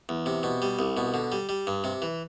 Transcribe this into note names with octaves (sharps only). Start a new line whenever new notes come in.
E2
C3
B2
G3
C2
B2
D3
G3
G3
G2
C3
E3